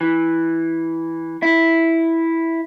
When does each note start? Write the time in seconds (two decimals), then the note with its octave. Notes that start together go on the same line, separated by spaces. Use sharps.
0.01 E3
1.42 E4